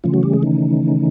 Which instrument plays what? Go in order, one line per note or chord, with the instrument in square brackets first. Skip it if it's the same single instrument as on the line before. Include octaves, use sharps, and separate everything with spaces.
[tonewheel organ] C#3 E3 F3 A3 C#4 F4
F#3 F#4
G3 G4
G#3 G#4
D#3 D#4